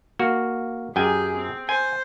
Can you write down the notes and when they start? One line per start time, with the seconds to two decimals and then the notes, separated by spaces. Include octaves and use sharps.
0.19 A#3 F#4
0.96 F#2 G4 G#4 G5 G#5
1.37 C4
1.69 C5 G#5